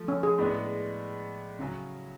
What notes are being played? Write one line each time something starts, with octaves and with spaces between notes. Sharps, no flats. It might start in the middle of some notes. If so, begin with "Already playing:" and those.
Already playing: F3 A3
C#4
G#4
A2 G#3 B3 D4
C#3 F#3 C#4